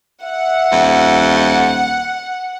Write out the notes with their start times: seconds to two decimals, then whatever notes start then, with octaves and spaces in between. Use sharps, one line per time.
0.23 E5 F#5
0.72 D#1 F2